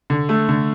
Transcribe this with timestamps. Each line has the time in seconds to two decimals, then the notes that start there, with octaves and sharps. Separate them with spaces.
0.10 D3
0.29 A3
0.49 D3